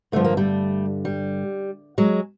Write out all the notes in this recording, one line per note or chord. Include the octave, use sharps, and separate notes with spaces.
G2 D3 F3 A3
A#3
G3 A3
G3
F#3 G#3